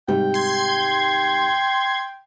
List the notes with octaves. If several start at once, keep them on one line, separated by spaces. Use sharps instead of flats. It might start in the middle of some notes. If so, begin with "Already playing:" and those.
G#2 C3 G3 G5
C6 G#6